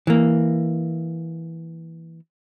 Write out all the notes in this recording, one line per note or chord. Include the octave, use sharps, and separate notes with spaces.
E3 A#3